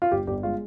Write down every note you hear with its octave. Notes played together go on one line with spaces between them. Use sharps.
F4
G1 G4
G1 G4
G#3 F4